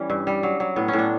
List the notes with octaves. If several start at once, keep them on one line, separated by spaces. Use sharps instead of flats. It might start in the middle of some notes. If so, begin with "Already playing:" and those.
Already playing: E3 G3 C#4
G2
G3
F#3
F#3
A2 B3
C#4
A2
D4